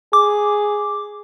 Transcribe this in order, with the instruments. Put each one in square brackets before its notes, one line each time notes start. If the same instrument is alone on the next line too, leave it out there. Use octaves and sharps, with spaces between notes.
[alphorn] G#4 [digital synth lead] D6